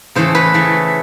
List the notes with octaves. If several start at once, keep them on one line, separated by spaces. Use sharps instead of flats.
C#3 E3 A3 C5
B4
C#3 E3 A3